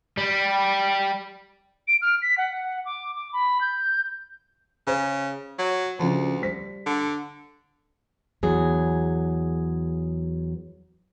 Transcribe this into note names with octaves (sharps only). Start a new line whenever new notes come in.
G3
D7
F6
B6
F#5
D6
D6
B5
G6
C#3 C5
F#3
D2 C#3 F3
G3 C5 B6
D3
E2 F#3 G#4